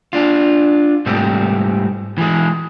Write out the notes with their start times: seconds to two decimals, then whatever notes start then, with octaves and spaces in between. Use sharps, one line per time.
0.13 D4 F4
1.06 G#2 C3 G3 A3 C4
2.18 E3 G#3